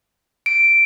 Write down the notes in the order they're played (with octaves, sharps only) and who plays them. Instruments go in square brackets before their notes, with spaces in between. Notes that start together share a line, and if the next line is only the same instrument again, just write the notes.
[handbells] D7